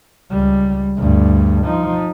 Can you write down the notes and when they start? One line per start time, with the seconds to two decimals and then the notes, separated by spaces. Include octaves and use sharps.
0.31 C#2 G3
0.98 D2 G2
1.66 F3 D#4